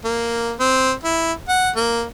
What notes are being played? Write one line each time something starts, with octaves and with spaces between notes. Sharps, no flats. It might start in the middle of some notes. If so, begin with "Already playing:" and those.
A#3
C4
E4
F#5
A#3